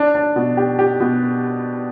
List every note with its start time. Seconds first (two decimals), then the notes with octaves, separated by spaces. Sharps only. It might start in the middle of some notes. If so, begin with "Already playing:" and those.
Already playing: D4
0.15 D4
0.36 B2
0.57 G4
0.79 G4
1.00 B2